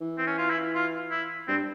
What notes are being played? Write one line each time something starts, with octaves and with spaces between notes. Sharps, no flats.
E3
C4
C#4
F4
E4
F4
E4
G2 C4